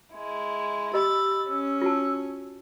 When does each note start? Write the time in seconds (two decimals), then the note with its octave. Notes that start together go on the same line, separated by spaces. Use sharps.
0.14 G#3 E4
0.94 G4 D#5 B5 C6 E6 A6
1.48 C#4
1.82 F4 F#4 A5